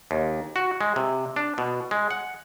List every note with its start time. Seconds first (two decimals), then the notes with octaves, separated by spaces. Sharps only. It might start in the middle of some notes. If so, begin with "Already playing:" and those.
0.11 D#2
0.56 F#4
0.81 G#3
0.96 C3
1.36 D4
1.58 B2
1.91 G#3
2.11 F#5